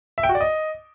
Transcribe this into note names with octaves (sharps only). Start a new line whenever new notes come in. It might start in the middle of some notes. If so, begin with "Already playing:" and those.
E5
G5
F#4
D5
D#5